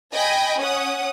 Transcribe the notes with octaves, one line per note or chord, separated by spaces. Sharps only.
D#5 G5 G#5 B5
C#4 F#5 D#6